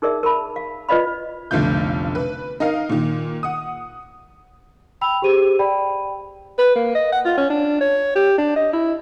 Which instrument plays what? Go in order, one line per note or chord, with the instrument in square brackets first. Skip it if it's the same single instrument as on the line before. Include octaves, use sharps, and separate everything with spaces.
[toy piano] D#4 G#4 A#4 D5 E5
A#4 A5 B5
F5
F4 B4 D5 D#5 F5 B5
[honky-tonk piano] F1 B1 D3 A3 F4 G6
B4
D#4 A#4 D#5 F5
A#2 D#3
F#5 D#6
[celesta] G5 B5 E6 F7
G4 G#4 C5 D#7
D5 G5 B5
[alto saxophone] B4
A#3
D#5
F#5
F4
C#4
D4
C#5
G4
D4
D#5
E4